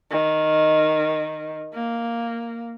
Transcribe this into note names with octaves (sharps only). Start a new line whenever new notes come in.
D#3
A#3